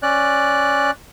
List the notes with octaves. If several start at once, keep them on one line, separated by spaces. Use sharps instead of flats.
C#4 D5 F#6